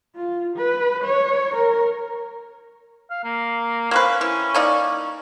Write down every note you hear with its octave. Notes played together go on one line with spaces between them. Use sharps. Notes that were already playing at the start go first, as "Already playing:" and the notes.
F4
B4
C#5
A#4
F5
A#3
A#3 C4 C#4 B4
E3
A#3 D#4 D5